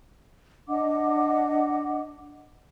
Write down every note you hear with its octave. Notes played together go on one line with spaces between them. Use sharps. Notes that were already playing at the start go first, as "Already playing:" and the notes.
D4 D#5 F#5 D6